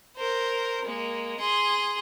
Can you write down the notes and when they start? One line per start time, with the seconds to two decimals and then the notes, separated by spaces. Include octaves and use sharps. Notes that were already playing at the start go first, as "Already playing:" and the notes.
0.16 A#4 C5
0.85 G#3 A#3
1.39 G#4 C6